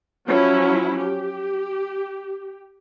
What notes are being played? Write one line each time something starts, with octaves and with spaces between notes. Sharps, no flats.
F3 F#3 C#4 E4
G4